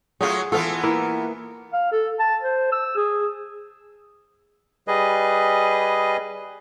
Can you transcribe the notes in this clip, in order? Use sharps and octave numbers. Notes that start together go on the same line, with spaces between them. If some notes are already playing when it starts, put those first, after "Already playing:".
F#3 A3 F4 G#4
E3 B3 F4 A4 F5
A#3 E4 B4
F5
A4
A5
C5
E6
G#4
G3 G#4 B4 D#5